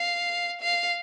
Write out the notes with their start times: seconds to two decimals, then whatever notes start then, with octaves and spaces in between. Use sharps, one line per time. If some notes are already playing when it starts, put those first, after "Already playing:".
Already playing: F5
0.61 F5